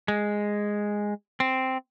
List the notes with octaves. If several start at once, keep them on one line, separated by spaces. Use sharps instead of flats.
G#3
C4